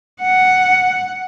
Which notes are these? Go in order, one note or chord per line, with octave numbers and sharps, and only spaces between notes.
F#5